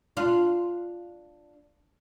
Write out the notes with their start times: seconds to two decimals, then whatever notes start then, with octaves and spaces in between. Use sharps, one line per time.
0.17 D4 F4